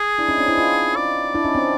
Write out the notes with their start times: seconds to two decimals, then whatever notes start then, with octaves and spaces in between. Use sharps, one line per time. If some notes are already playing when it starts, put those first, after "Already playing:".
Already playing: G#4
0.18 D4 E4
0.29 C#4 D#4
0.38 C4 D4
0.48 D4 E4
0.57 D#4 F4
0.96 D5
1.34 D4 E4
1.44 C#4 D#4
1.55 C4 D4